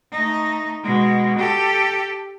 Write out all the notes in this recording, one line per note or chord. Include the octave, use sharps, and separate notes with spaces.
A3 D#4
B2 G#3
G4 A4